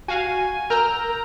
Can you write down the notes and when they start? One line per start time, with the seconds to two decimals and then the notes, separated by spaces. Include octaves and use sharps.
0.08 F#4 F5 G#5
0.70 A#4 A#5 E6 F6 G6